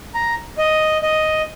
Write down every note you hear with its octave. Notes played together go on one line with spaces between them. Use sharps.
A#5
D#5
D#5